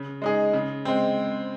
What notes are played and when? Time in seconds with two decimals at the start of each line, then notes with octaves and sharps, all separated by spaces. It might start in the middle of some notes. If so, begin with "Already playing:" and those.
Already playing: C#3
0.22 G#3 D#4 G#4
0.54 C#3
0.85 G#3 C4